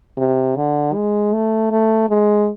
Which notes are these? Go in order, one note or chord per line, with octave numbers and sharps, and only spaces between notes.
C3
D3
G#3
A3
A3
G#3